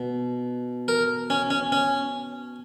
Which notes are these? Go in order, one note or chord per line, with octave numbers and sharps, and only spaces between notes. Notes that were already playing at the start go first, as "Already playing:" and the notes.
Already playing: B2
A#4
C#4
C#4
C#4